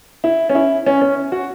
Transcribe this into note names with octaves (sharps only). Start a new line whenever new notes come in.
E4
C#4
E4
C#4
C#4
F#4